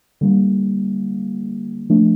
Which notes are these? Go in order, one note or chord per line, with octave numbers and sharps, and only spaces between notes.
D3 G3 A#3
F3 A3 D4